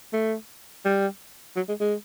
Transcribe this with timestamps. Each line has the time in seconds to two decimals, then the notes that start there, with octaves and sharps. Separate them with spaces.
0.13 A3
0.85 G3
1.56 F#3
1.68 G#3
1.80 G#3